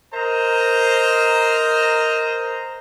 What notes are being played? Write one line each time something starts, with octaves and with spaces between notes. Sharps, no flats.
A#4 C5 D#5 A#5